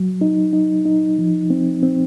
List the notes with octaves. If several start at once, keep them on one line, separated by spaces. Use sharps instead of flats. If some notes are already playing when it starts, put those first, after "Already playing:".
Already playing: F#3
D#4
D#4
D#4
F3
C4
C4